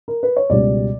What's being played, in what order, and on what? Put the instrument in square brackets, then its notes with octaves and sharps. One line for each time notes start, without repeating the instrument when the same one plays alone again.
[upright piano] A#4
B4
C#5
C#2 B2 G3 D5